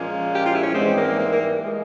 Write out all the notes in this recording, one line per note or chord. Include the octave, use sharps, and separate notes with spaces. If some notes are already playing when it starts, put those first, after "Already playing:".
Already playing: A#2 F3 G#3 A#3 C#4
G4
F4
E4
C#4
G#2 E3 G3 G#3 C4
A#3
A#3
A#3
F3 G#3